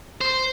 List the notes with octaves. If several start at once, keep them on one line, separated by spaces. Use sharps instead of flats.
C5